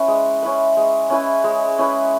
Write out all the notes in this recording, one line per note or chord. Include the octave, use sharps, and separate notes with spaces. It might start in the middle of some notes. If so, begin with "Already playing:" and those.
Already playing: C#4 E4 B4
G#3
C#4 E4 B4
G#3
C#4 E4 B4
G#3
C#4 E4 B4